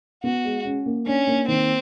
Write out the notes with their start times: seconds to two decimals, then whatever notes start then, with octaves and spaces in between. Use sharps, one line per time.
0.24 B3 F#4
0.45 G#3
0.65 C#4
0.86 A#3
1.06 C#4 D4
1.27 A#3
1.48 D#3 C4